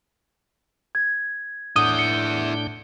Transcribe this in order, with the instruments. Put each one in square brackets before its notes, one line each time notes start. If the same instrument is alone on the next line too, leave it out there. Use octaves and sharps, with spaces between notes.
[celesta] G#6
[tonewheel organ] A2 D4 G6 [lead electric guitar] E4 F#5 [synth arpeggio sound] D#6
[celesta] C#7